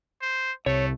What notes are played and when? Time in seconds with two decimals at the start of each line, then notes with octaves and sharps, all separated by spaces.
0.22 C5
0.66 C2 A3 C#5